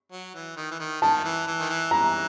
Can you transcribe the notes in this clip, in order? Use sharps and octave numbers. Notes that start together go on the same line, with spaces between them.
F#3
E3
D#3
E3
D#3
D#3 A5
E3
E3
D#3
E3
E3 A#5